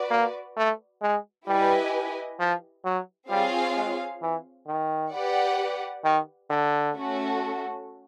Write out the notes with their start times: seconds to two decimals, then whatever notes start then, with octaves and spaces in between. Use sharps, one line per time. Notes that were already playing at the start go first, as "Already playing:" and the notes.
Already playing: F#4 B4 D5
0.10 A#3
0.57 A3
1.02 G#3
1.47 G3 E4 G4 B4 D#5 G#5
2.39 F3
2.85 F#3
3.30 G3 C4 F4 G#4 C#5 F5
3.76 G#3
4.22 E3
4.67 D#3
5.13 G4 B4 D5 F#5
6.04 D#3
6.50 D3
6.95 A3 C#4 F#4 A4